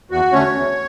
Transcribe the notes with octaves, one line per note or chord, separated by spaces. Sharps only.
E2 F#4
D3 A3 C#4 C#5
E2